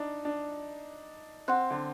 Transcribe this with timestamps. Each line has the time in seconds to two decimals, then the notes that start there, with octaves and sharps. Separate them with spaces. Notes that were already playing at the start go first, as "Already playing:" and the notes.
Already playing: D4 D#4
0.25 D4
1.48 C4 F#5 C6 F#6
1.70 D3